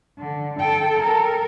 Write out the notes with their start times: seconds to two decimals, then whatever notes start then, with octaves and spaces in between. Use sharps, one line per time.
0.18 D3
0.59 A4 G5
1.00 A4 A#4